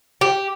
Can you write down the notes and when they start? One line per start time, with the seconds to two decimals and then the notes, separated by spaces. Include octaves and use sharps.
0.21 G4